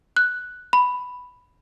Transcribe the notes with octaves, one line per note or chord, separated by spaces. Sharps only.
F#6
B5